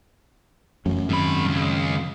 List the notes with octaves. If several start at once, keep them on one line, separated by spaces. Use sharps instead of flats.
F1 F#2 E3 A3
G#2 D#3 C4 B5
C#2